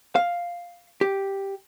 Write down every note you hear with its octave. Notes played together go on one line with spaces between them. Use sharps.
F5
G4